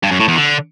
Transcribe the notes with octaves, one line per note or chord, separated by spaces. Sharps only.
G2
F#2
A2
E2
D3